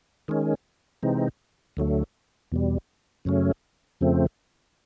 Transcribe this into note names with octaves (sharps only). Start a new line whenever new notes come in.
D#3 G#3 C#4
C3 E3 G#3 C4 D#4
D2 D3 F#3 A3
E2 B2 G3
F#2 C#3 F#3 A3 C#4
F2 C#3 F3 A3 C4